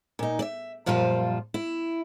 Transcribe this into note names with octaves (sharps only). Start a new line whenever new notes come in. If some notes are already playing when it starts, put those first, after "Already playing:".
A#2 D#4
D5 E5
F#2 A#2 F3 G3 F4 C5
E4